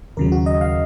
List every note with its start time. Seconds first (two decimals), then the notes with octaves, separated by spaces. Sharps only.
0.17 D#2 C#3 F#3 A#4
0.32 F#4
0.46 D#5
0.61 F5